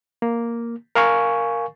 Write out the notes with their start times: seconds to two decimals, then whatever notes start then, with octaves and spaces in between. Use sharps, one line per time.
0.22 A#3
0.95 A#4 F5 G#5 C#6